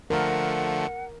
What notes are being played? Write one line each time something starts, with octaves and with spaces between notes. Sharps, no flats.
D3 F3 A3 A#4 F#5